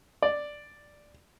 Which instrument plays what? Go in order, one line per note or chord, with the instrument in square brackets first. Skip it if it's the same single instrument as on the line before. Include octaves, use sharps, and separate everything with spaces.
[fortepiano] D5